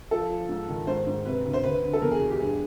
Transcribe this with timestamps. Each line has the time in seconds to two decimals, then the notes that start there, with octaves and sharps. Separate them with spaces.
0.11 F3 A4
0.30 F3
0.49 G#2
0.69 D#3
0.87 G#2 C5
1.07 G#2
1.26 C3 B4
1.45 D2
1.53 C5
1.64 D2 B4
1.83 D3
1.93 A4
2.02 E2 A#4
2.11 G#4
2.21 B2
2.30 G4
2.40 G2 G#4